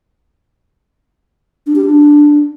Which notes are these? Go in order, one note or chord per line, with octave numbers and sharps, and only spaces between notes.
D4
G4
D4